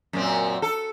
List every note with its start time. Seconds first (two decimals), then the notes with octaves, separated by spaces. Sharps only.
0.13 F#2 A#2 C4
0.62 A4